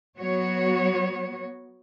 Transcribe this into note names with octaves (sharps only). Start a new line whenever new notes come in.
F#3 B3 F#4 C#5